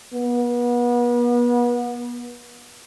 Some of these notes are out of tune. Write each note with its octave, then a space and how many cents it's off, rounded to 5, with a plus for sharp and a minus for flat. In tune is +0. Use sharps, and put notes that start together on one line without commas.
B3 -35